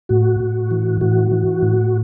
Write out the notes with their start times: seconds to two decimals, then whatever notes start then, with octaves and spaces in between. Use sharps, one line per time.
0.09 A2 F#4
0.40 A2
0.71 E3
1.01 A2 F#4
1.31 E3
1.62 A2